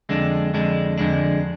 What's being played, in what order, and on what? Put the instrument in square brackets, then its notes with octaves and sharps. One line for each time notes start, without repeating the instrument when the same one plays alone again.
[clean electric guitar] F2 D3 G#3 D4
F2 D3 G#3 D4
F2 D3 G#3 D4